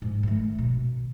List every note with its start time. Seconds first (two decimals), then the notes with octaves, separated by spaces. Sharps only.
0.02 G#2
0.23 D#3 A3
0.55 B2 D#3